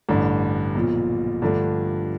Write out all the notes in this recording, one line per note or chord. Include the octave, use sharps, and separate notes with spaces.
A1 G2 D3
B1 A#2 F3
G2 D3 F3 A3 D4